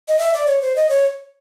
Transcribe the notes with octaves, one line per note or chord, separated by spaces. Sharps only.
D#5
E5
D5
C#5
C5
D#5
C#5